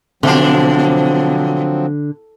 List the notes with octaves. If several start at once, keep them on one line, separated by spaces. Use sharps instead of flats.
B2 D3 F3 F#3 C4 D4